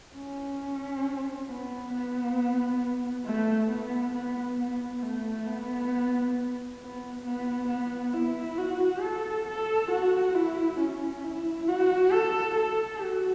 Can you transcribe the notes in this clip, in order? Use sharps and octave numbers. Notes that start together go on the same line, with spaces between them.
C#4
B3
B3
A3
B3
B3
B3
A3
B3
B3
B3
B3
E4
F#4
A4
A4
F#4
E4
C#4
E4
F#4
A4
A4
F#4